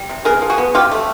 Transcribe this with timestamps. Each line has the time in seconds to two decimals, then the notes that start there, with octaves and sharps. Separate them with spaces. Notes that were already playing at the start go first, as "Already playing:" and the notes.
Already playing: G3
0.09 C3
0.25 B3 G#4 A#4
0.42 F3
0.50 F#4 G#4
0.58 B3
0.74 F#3 F4 G4
0.91 A3